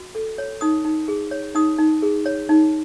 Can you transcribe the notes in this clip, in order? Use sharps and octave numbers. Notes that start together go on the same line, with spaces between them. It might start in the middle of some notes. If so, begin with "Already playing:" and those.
Already playing: F#4
A4
C#5
D#4 D#6
D#4
G#4
C#5
D#4 D#6
D#4
G#4
C#5
D#4